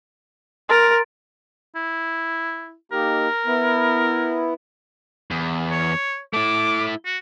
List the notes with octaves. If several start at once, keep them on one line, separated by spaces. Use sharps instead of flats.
A#4 C6 A6 D7
E4
A#3 D#4 G4 A#4
B3 E4
E2
C#5
A3 E4 D6
F#4